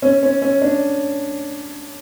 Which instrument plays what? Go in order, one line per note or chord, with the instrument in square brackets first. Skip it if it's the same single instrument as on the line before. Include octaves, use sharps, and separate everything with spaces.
[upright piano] C#4
C#4
C#4
D4